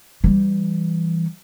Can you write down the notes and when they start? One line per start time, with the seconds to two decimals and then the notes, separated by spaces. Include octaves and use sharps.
0.24 E3 G3